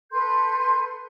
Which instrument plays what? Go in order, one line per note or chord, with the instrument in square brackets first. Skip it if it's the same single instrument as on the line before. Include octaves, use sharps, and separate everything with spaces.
[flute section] A4 B4 C6 G6